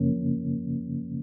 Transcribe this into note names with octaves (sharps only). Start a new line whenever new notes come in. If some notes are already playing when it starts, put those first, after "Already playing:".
Already playing: F#2 C#3 F3 A#3 C#4